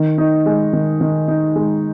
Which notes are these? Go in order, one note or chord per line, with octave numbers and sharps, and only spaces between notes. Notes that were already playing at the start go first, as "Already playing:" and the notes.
Already playing: D#3
D#4
G#3
D#3
D#3
D#4
G#3